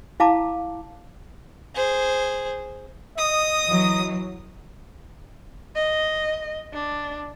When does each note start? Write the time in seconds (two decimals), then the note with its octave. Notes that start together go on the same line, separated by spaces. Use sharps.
0.20 E4 F5 A5 A#5 D6
1.75 G#4 C5
3.18 D#5 D#6
3.65 E3 F#3
5.76 D#5
6.73 D4